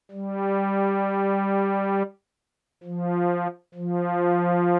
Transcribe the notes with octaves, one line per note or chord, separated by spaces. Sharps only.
G3
F3
F3